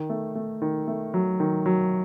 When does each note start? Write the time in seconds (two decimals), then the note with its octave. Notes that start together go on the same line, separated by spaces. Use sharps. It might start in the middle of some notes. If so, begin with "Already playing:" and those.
Already playing: D#3
0.10 A3
0.35 A3
0.62 D#3
0.88 A3
1.14 F#3
1.40 D#3
1.66 F#3